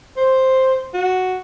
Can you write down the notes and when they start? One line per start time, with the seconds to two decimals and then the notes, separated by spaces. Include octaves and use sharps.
0.17 C5
0.94 F#4